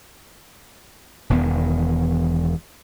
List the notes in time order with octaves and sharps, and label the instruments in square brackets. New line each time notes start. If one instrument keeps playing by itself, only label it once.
[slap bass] E1 E2 D#3 B3